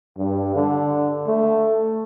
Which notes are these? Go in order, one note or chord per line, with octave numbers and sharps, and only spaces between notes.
G2
D3
A3